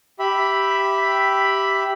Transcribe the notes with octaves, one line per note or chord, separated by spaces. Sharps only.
G4 E5 B5